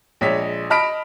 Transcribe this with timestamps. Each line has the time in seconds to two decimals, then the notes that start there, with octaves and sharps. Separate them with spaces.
0.21 A#1 G#3 C#5 B6
0.70 D#5 A5 B5 F6 B6 D7